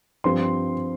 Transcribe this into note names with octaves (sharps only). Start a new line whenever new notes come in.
G2 F3 C4 C6